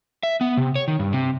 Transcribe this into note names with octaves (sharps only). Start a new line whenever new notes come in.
E5
B3
C3
C#5
D#3
G2
C3